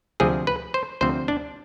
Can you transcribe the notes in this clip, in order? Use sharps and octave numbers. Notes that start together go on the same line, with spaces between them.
D2 C3 F3 C4 G#4
B4
C5
D2 C3 F3 C4 C5
D4